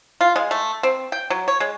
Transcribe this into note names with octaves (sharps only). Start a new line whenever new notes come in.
F4
G#3
A3
C4
G5
F#3
C#5
G#3